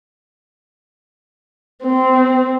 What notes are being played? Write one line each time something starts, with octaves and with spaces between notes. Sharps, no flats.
C4